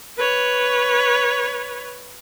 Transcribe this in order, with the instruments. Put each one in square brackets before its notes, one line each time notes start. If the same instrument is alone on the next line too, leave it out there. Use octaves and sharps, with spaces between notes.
[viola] B4 C#5